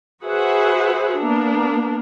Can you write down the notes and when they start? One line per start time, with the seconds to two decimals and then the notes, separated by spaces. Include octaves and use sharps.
0.23 F#4 G#4 B4 C5 E5 F#5
1.20 A#3 B3 D4 A#4